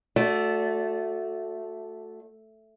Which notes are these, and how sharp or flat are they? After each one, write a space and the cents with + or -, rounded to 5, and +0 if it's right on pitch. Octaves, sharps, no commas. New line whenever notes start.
A3 +0 F#4 -25 D5 -20